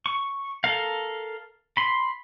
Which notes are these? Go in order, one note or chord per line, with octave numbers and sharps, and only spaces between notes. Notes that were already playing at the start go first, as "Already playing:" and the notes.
C#6
A4 A#4 F5
B5 C6